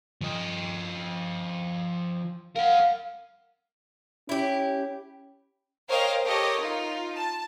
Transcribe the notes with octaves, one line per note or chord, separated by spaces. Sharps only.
F3 D#5
A#4 F5 F#5
C#4 E4 G4
A#4 C5 C#5 D#5 F5 G5
G4 A4 A#4 C#5 D#5
D#4 F4
A5